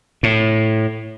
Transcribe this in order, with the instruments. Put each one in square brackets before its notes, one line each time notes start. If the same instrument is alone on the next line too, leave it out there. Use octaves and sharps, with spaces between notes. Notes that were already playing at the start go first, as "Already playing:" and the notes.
[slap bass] A2